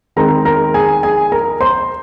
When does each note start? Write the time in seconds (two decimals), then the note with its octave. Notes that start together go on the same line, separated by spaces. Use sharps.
0.16 D#3 G#3 C4 D#4 A#4 A#5
0.45 A#4 A#5
0.74 G#4 G#5
1.03 G#4 G#5
1.32 A#4 A#5
1.61 C5 C6